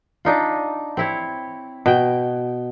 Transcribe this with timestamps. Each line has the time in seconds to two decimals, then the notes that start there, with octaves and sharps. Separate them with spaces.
0.25 D4 D#4 F4
0.97 C4 E4 C#5
1.86 B2 G5